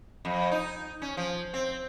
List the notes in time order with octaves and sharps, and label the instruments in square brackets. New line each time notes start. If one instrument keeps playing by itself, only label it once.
[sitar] F2
D#4
C#4
F3
C4